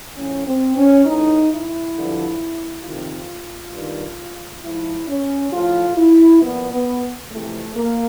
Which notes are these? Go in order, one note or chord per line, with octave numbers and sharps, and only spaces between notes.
A2 F3 C#4
C4
C#4
A2 E3 D#4
E4
G2 D3 F3
F2 C3 D#3 F4
G2 D#3
G#2 F3 E4
C#4
A2 F3 F4
E4
A#2 F3 B3
B3
F2 C3 E3 A3
A#3